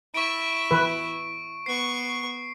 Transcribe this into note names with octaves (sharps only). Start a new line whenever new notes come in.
E4 E5 C#6 D7
E3 B4
B3 C#6 C7